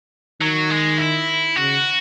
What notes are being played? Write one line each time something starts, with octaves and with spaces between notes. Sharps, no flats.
D#3 F#3
G#3
E4
C#3 F#4